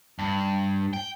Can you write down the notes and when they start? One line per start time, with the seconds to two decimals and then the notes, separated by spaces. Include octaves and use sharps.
0.19 G2
0.93 G5